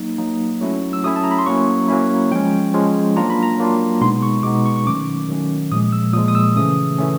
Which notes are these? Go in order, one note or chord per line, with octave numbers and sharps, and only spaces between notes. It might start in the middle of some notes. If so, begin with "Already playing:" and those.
Already playing: F#3 A#3 D#4
F#3 A#3 D#4
F#3 A3 C#4 E4
E6
F#3 A3 C#4 E4 D#6
A5
A#5
B5
C6
F#3 A#3 C#4 E4 C#6
F#3 A#3 C#4 E4
F3 G#3 C#4 G5
F3 G#3 C#4
F#3 A#3 D4 F4 A#5
B5
A#5
F#3 A#3 D4 F4
B2 G#3 B3 D#4 C6
C#6
B2 G#3 B3 D#4 D6
C#6
C#6
D#3 F#3 A3 C#4 D6
D#3 F#3 A3 C#4
A#2 F3 G#3 D#6
E6
A#2 F3 G#3 D#6
D#6
E6
C#3 E3 A3 C#4 D#6
E3 A3 C#4